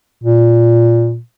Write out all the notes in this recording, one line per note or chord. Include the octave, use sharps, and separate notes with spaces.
A#2